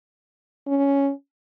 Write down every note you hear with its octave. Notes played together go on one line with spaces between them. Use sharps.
C#4